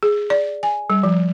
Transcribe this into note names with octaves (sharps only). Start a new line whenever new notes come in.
G#4
D5
G#5
G3
F3